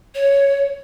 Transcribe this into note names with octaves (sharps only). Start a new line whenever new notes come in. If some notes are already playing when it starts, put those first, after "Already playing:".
C#5